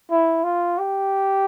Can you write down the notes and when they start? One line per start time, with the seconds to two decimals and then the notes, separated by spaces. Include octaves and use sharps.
0.11 E4
0.44 F4
0.79 G4